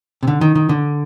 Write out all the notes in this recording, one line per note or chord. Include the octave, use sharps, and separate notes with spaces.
C3
D3
D#3
D#3
D3